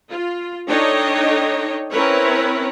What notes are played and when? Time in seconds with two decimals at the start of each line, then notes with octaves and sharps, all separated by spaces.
0.10 F4
0.68 D4 D#4 A4 C#5 D#5 G5
1.91 C4 C#4 E4 A#4 B4 C#5